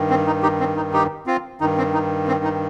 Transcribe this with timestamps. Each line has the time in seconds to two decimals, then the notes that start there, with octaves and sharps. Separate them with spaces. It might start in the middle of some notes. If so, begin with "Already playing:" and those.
Already playing: G2 D#3
0.10 C4
0.27 D#4
0.43 D#4 G4
0.60 C4
0.76 D#4
0.93 D#4 G4
1.26 C4 F4
1.61 G2 D#3 D#4
1.78 C4
1.94 D#4
2.28 C4
2.44 D#4